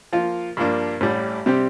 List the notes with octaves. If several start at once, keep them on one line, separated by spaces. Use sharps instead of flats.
F3 A#3 F4
G2 F3 A#3 D4
A1 A2 G3
C3 G3 C4 G4